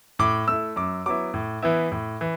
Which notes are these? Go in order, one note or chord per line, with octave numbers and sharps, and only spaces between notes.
A2 D6
A3 E4 E6
F#2 D6
F#3 B3 E4 D6
A2
E3 B3 E4
A2
E3